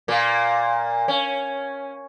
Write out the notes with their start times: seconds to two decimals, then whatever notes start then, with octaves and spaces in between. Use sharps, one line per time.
0.08 A#2 A#3
1.08 C#4